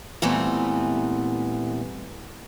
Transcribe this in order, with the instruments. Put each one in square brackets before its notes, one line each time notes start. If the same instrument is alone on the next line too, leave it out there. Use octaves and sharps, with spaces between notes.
[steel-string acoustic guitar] A#2 E3 G3 A3 B3 C4